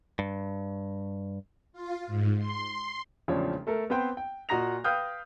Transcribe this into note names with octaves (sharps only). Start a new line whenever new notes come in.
G2
F4
G#2
C6
E1 A1 C#3 F3 D4 C#5
A3 A4 A#4
B3 C4 B4 C5 G5
G5
A#2 F#4 D#5 A#5 A#6 F7
B4 F5 G5 D#6 F6 G6